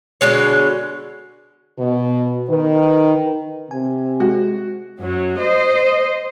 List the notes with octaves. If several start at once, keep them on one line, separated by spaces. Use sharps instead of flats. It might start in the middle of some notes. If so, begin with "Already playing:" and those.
B2 D3 G#3 C#5
B2
D#3 B4
C3 G#5
G#3 F#4
F#2 F#3
C5 D#5